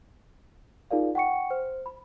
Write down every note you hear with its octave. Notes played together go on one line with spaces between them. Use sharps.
D#4 F4 G#4 A#4 D5 F5
F#5 G5 C#6 C#7
C5
B5